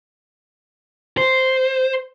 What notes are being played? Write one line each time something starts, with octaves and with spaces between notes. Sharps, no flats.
C5